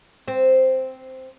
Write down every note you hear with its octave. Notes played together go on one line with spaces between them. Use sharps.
C4